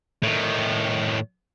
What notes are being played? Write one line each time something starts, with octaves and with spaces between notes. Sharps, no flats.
A2 D#3